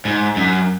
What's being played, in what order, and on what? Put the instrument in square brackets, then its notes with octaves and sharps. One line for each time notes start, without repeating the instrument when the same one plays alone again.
[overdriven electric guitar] G#2
F#2